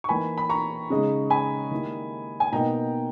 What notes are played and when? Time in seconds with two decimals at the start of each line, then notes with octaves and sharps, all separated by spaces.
0.04 C#6
0.09 E3 A#3 D#4 G#5 B5
0.38 B5
0.50 A#5 C#6
0.90 C#3 G#3 D#4
1.30 G#5 B5
1.71 D#3 G3 A#3 E4
2.40 G#5
2.53 B2 A#3 D#4 G5 A#5